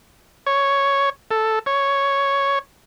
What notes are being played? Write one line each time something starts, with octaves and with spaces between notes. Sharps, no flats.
C#5
A4
C#5